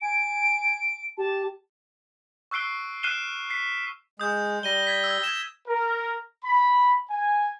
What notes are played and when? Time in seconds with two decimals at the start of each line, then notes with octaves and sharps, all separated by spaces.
0.01 G#5 D7
1.18 G4 A5
2.51 C#6 E6 F#6 C7 D7 G7
3.03 F6 F#6 C7 D#7 E7 G7
3.50 B6 C7
4.20 G#3 D#6 G6
4.63 G3 A#6 D#7 G7
4.87 G#6 B6
5.04 E6 G#6
5.24 G#6 E7
5.68 A#4
6.44 B5
7.10 G#5